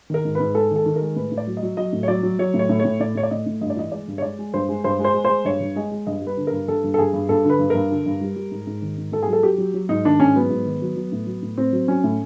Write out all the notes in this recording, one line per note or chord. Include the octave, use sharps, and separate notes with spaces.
D#3 A#4
G#2
B4
G#2
G#3 A4
D#3 A4
D#3
A#4
G#3
A2 B4
A2
D5
F#3
D#5
F#3
F#3 D#5
A2
C#5
F#3 D5
F#3
F#3 C#5
A2
C#5
A2
C#5
A2
A2 D5
A2 C#5
D5
A2 D#5
A2
G2 D#5
D5
E3 D#5
G#3 D5
G2
C#5
G#3 D5
G#3
G2 C5
G#3
G2 C5
G#3
C5
G#3
G#3 C5
G2 C#5
G2
G#3 D#5
G#3
G2 D#5
G3
B4
D3
A#4
G2
G2 A4
G2
A4
G2 G#4
G2
G2 A4
D3 B4
G2
G2 A#4
D3
G2
G3
G3
G#2
G#2
D#3
G#2
G#2 A4
G#4
F#3
A4
F#3 G4
F#3
F#3
G#2 D#4
D#3 D4
G#2 C#4
F#3 B3
G#2
D#3
F#3
F#3
A2
F#3
A2
A2 C4
F#3
F#3 C#4
A2